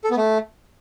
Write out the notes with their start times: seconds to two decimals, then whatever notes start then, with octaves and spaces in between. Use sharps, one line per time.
0.04 A4
0.11 B3
0.17 A3